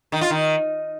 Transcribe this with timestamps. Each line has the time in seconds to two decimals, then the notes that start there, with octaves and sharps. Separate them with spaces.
0.12 D#3
0.21 F4
0.30 D#3